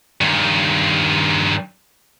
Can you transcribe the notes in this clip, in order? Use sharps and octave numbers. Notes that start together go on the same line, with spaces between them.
G2 D#3